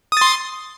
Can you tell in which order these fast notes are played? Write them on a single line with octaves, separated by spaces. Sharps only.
D#6 A6 C6